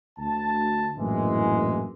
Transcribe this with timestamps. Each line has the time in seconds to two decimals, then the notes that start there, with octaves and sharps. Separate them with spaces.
0.18 D2 A5
0.97 A#1 F#2 A2 E3 G#3